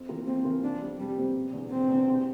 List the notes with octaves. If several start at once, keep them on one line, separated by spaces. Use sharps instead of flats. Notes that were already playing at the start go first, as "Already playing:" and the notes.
Already playing: F2
E3 A#3 F4 A#4
F2 C4
E3 A#3 F4 A#4
F1 D4
F2 C3 G3
F1 G3
F2 C3 G3
E1
E2 D3
E1 C4
E2 D3
C2